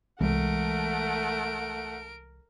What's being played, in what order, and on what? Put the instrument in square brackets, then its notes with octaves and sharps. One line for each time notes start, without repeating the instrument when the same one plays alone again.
[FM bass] C2 [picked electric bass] E3 G#3 [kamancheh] A3 F#5 [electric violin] A#4 D7